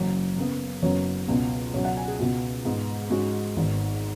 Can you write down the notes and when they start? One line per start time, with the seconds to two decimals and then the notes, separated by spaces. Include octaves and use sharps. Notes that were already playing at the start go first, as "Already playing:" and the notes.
Already playing: F#1 F#2 F#3 C#4 C#5
0.37 F#2 C#3 B3
0.83 F#1 F#2 F#3 B3 C#5
1.28 C#2 B2 B3
1.73 C#2 B2 F#3 C#5
1.85 F#5
1.97 G#5
2.08 G#4
2.19 C#2 B2 B3 F#4
2.65 G#2 G#3 B3
3.10 G#2 G#3 C#4 F#4
3.57 G#1 G#2 D#3 B3